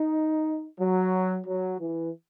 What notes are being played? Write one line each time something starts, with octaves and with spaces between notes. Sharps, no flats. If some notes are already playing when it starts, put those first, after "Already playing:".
Already playing: D#4
F#3
F#3
E3